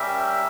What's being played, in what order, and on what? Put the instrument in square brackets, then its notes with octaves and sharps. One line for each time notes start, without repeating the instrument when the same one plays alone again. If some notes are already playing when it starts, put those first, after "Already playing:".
Already playing: [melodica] G3 C#4 G4 A#4 [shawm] E5